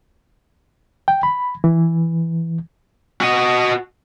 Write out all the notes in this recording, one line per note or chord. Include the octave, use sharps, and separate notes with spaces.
G5
B5
E3
F#4 D#5